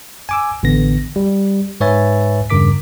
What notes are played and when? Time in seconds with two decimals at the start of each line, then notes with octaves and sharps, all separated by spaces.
0.29 G#5 D6 E6
0.63 A1 D3 B3 A#6
1.16 G3
1.81 G#2 B4 C#5 E5 G#5 A6
2.50 E2 G2 C#3 A#4 D6 B6